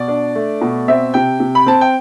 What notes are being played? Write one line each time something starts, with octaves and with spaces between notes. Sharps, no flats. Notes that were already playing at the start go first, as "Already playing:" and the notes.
Already playing: B2 D5
D4
A3
B2
C4 E5
C3 G5
C3
B5
C4 A5
G5